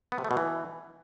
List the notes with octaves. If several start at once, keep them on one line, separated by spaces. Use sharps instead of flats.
B3
C3
A3
B2
E3